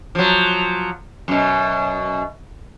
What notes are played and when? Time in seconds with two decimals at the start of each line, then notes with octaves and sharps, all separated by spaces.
0.15 F3 F#3
1.28 F#2 B2